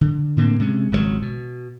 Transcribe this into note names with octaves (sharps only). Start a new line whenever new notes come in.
D3
A2 D3 A#3 C4
C3 G#3 C#4
G#1 C#2 C3 F#3
B2